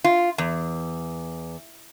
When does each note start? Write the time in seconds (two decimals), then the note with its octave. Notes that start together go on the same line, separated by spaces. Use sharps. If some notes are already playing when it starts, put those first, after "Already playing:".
0.04 F4
0.38 E2